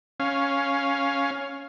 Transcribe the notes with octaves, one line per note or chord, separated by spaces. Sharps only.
C#4 F5